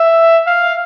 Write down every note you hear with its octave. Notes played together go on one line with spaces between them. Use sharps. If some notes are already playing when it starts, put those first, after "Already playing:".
Already playing: E5
F5